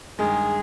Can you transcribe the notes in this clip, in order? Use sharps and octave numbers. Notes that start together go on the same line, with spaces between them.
G2 D#3 G#3 G#4